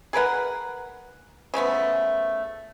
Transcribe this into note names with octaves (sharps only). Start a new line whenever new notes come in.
G#4 A#4 B4 F#5
C#3 F3 A3 B3